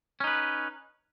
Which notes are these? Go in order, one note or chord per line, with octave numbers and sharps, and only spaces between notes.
C#4 D#4 B4